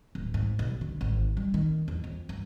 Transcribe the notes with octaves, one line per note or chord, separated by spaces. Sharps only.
D1
G#2
B1
D3
G#1
G3
D#3
E2
F2
G2